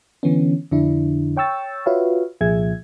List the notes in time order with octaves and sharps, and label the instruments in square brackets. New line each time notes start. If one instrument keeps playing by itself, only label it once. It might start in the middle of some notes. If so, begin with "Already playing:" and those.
[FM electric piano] D3 E3 B3 C#4
F2 D3 D4 E4
C#5 G5 C#6 E6 A6
F4 F#4 B4 C#5 E5 F5
C2 A#2 F3 G#4 E5 G#6